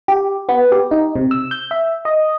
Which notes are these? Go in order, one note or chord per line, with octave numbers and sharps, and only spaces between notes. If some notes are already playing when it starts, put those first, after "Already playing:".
G4
B3
G4
D#4
C3
E6
G6
E5
D#5